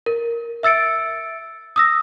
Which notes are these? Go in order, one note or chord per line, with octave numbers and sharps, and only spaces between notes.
A#4
E5 E6 A6 C#7 D7
D#6 E6 A#6